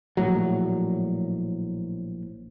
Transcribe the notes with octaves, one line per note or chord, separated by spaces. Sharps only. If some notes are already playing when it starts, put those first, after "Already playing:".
A#1 A2 F#3